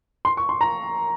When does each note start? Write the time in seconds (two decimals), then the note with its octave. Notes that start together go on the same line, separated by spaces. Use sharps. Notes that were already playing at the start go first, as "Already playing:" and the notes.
0.25 C6
0.37 C#6
0.49 C6
0.61 A#5